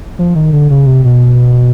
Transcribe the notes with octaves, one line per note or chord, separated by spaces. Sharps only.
F3
D#3
D3
C#3
C3
B2